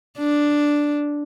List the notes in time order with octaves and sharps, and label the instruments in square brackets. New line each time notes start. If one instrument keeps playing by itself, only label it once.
[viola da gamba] D4